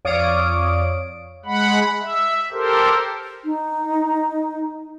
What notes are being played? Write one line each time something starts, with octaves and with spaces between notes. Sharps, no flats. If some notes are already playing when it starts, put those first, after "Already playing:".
F2 C#5 D5 F5 D#6 D7
G#3 F#5 B5
E5
G4 A4 A#4 C5
D#4